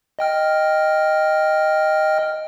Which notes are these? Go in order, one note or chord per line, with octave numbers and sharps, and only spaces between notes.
D#5 G5 F6